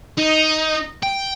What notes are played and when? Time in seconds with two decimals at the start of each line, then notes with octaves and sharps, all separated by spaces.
0.18 D#4
1.03 G5